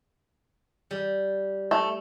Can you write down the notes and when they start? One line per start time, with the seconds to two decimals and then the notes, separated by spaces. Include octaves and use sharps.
0.91 G3
1.71 A3